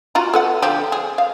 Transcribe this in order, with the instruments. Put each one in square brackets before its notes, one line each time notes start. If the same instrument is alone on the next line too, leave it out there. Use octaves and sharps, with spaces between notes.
[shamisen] F4 F#4 A#5
A4 B4 F#5
D3 F3 G4
G#4
F5